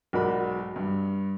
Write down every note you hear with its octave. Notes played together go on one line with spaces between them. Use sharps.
B1 G#2 F#4 A#4 D5 B5
G2